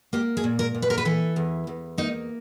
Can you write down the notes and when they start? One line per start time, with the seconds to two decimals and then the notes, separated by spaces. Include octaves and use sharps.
0.13 A#3 G4
0.37 G#4
0.44 A#2
0.59 A#4
0.75 A#2
0.82 B4
0.90 A#4
0.98 B4
1.05 E3 A4
1.36 E2
1.67 E2
1.98 A#3 D#4